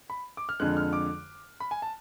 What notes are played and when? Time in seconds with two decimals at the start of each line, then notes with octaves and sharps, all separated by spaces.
0.10 B5
0.37 D6
0.49 F6
0.60 F2 D3 G#3 F#6
0.77 F6
0.93 D6
1.60 B5
1.71 G#5
1.82 A5